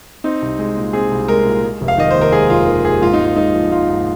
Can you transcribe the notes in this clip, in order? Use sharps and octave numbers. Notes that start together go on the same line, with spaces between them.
C4 D#4
C2
G#3
A#2
C4 G#4
C2
G#3 A#4
A#2
G#3
F1
F5
D#3 D#5
D#2 C5
A#4
G#3 G#4
F1 F4
D#3
D#2 G#4
G#2 F4
D#4
G#2 F4
G#3 D#4
F3
G#2 F4
G#2